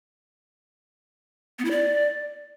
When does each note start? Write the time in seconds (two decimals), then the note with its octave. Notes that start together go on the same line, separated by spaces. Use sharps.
1.59 B3
1.65 E4
1.71 D5